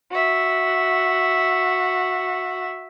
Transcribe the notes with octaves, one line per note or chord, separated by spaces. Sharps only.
F#4 E5